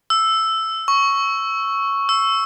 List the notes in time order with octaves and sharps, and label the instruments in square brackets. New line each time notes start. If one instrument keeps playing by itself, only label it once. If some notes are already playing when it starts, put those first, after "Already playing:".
[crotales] E6
C#6
E6